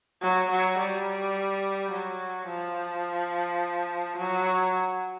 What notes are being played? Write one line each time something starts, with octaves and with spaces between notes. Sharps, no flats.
F#3
F#3
G3
F#3
F3
F#3